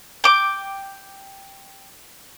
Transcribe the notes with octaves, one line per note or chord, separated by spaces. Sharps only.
G5 D6